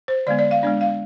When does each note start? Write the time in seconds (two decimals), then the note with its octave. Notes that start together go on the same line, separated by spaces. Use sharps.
0.08 C5
0.27 D3 G#3 B3 D5
0.39 D5
0.51 F5
0.63 G#3 B3 D4 D5
0.81 F5